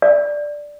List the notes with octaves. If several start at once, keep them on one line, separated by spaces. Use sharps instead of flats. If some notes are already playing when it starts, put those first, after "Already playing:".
D5